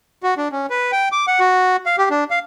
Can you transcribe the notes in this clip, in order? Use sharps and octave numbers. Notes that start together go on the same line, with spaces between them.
F#4
D4
C#4
B4
G5
D6
F#5
F#4
F5
G4
D4
F5